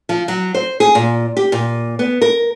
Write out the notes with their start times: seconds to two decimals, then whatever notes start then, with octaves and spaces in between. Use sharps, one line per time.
0.09 F3
0.28 F#3
0.55 C5
0.80 G#4
0.95 A#2
1.37 G4
1.52 A#2
1.99 B3
2.22 A#4